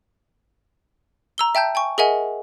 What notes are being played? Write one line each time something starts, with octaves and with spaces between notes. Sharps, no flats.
A#5 E6 G7
E5 G5 A5 G6
G5 G#5 C#6
G#4 A#4 D#5 E5 F#5 G#5